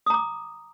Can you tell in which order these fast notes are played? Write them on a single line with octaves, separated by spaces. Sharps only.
D#6 A#5 D6